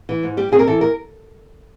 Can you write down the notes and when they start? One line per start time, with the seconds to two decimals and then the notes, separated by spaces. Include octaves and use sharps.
0.09 E3
0.23 G#2
0.37 G3 G4
0.52 C4 G#4
0.59 A#4
0.67 E3 A4
0.81 A#4